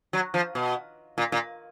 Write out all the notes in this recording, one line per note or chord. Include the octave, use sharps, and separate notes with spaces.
F#3
F3
B2
A#2
A#2